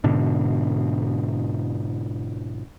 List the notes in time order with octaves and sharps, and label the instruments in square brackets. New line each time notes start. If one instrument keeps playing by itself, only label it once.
[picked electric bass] G#2 B2 D3